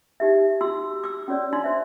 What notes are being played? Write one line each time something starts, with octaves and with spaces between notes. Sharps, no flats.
D#4 G4 E5
F#4 C6 E6
D6 E6
C#4 F#4 C#5 D5
D4 C6
C5 E5